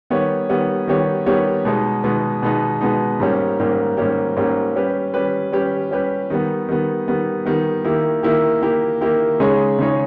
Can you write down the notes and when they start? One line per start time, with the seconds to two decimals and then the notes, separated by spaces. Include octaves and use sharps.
0.10 D#3 G3 B3 G4 C#5
0.49 D#3 G3 B3 G4 C#5
0.87 D#3 G3 B3 G4 C#5
1.26 D#3 G3 B3 G4 C#5
1.65 B2 G#3 B3 D#4
2.04 B2 G#3 B3 D#4
2.42 B2 G#3 B3 D#4
2.81 B2 G#3 B3 D#4
3.20 G#2 G3 A#3 C#4 G4
3.59 G#2 G3 A#3 C#4 G4
3.97 G#2 G3 A#3 C#4 G4
4.36 G#2 G3 A#3 C#4 G4
4.76 G3 C#4 G4 B4
5.14 G3 C#4 G4 B4
5.52 G3 C#4 G4 B4
5.91 G3 C#4 G4 B4
6.30 D#3 G3 B3
6.69 D#3 G3 B3
7.08 D#3 G3 B3
7.46 D#3 G3 B3
7.85 D#3 A#3 E4 G4
8.23 D#3 A#3 E4 G4
8.62 D#3 A#3 E4 G4
9.01 D#3 A#3 E4 G4
9.40 C#3 G#3 D#4 G#4 C#5
9.79 C#3 G#3 D#4 G#4 C#5